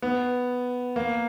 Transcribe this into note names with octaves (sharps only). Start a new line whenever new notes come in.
B3
A#3